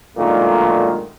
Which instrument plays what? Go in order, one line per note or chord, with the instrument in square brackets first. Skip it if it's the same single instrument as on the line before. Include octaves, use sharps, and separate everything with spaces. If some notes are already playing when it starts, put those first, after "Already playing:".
[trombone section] B1 A#2 D3 D#3 G#3 A3